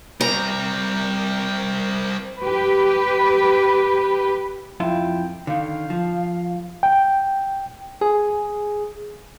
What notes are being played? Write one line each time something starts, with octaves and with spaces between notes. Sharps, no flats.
G3 C4 A#4 A#5
G4 B4
F2 E4 F4 G5
D3 D#3 F5
F3
G5
G#4